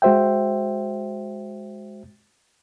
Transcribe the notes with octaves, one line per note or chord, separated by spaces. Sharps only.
G#3 F#4 C5 E5 G5